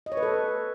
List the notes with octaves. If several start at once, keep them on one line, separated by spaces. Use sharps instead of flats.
D#5
C#5
B4
A4